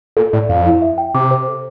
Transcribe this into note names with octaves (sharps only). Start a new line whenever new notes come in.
A#2 A4
A2 D5
F2 F5
E4
E5
G5
C3 D6
C5
A4